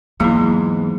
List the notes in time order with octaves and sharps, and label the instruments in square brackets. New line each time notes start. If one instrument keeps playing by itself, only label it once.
[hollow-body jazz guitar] E2 G#2 G#3 [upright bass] F#3 [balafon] A#3 E4